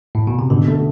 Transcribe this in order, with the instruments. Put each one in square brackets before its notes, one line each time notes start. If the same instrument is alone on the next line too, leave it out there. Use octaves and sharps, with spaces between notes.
[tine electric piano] A2
B2
C3
[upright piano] B2 [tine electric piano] D3
[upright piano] A3